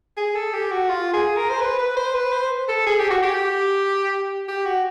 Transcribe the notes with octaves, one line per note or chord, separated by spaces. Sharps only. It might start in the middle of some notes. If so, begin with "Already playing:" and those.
G#4
A4
G4
F#4
F4
G#4
A#4
C5
B4
B4
C5
B4
C5
A4
G#4
G4
F#4
G4
G4
F#4